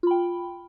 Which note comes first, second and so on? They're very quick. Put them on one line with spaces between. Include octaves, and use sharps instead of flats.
F4 B5 G5